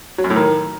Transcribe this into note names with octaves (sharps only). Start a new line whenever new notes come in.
F#3
F#2
A2
D#3